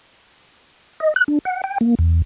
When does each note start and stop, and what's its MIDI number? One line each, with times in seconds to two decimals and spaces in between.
1.00 1.14 75
1.16 1.24 90
1.28 1.39 62
1.45 1.62 78
1.64 1.78 79
1.81 1.95 58
1.99 2.22 40